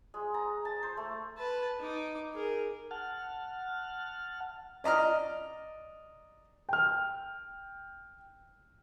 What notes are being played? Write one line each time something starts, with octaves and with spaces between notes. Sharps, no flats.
G#3
A#5
A5
C5
A3
B4 A5
D#4 D6
G#4 A#4
F#5 A5 F6
D5 D#5 A#5 F6
G5 F6